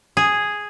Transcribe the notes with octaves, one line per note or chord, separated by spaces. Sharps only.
G#4